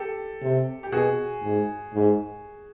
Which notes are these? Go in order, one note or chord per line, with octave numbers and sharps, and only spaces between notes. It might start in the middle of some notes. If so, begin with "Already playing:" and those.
Already playing: G4 A4
C3
G4
B2 F#4 G#4
G#2
G#2